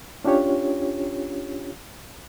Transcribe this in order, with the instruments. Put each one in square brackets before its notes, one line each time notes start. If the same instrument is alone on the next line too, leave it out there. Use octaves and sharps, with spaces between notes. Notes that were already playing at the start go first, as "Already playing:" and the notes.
[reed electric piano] C#4 D4 F4 G4 C#5